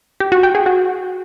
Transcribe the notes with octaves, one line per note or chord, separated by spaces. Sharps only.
G4
F#4
G5
G#4
F#4